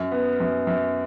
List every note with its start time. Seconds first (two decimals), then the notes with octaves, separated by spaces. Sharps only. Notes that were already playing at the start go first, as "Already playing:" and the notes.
Already playing: F#2
0.12 B3
0.40 F#2
0.67 F#2